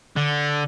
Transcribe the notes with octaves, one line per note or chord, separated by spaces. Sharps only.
D3